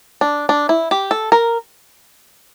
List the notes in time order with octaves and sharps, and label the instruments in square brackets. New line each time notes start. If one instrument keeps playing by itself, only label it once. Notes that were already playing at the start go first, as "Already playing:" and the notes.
[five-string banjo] D4
D4
E4
G4
A4
A#4